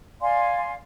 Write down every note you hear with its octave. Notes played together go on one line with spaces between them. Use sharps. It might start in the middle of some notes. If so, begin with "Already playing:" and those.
D5 F5 G#5 C6